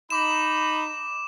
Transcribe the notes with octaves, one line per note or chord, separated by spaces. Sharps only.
D#4 B5 D6 E7